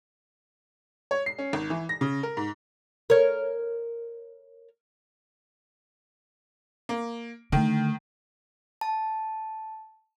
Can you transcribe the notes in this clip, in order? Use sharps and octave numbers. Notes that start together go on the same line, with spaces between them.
C#5
C7
C#4
G#1
E3
A#6
C#3
A#4
G#2
A#4 C#5
A#3
D3 D#3 A3
A5